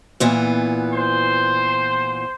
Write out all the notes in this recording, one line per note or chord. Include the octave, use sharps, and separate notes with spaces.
A#2 E3 B3
C5